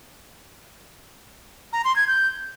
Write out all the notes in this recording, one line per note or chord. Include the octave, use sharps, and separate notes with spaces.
A#5
C6
G#6
G6